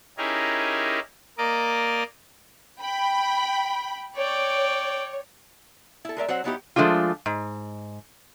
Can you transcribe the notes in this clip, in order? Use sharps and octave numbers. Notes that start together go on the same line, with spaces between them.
C#4 D#4 E4 G4 G#4 A#4
A#3 A#4 D5 D#5 D6
G5 B5
C#5 D5 G5
E4 A4
G#3 A#4 D5 E5
F#3 C4 C5 F#5
F#3 G3 B3 D#4 E4 G4
F3 G#3 A3 D4 F4
G#2